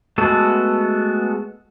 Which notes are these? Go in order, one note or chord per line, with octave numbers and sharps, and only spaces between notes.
G#3 A3 B3 F#4 A4